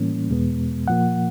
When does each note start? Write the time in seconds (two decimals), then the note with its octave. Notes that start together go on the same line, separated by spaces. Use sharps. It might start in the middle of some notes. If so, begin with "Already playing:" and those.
Already playing: A2 E3 G3 A#3 C#4
0.30 E2 B2 G#3 B3
0.88 A#2 F3 A#3 F#5